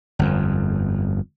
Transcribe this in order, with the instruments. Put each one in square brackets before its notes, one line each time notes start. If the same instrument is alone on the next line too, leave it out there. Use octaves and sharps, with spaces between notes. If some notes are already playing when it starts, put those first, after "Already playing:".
[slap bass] G1 F2